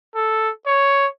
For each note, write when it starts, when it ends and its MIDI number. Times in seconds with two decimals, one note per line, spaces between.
0.15 0.50 69
0.66 1.07 73